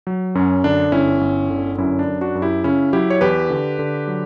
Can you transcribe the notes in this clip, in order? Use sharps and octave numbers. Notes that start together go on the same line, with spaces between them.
F#3
F#2 C#4
D3 D4
G1 C#4 E4
G1
D3
F#2 C#4 E4
D4
F#2
D4 F#4
F#2
E4 G4
C#3 C#4 E4
F#3 E4 G4
C#5
E2 G4 B4
D3
D3
F#3